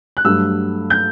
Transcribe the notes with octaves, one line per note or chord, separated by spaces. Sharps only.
F#6
G2 F#3 A3 E6
G6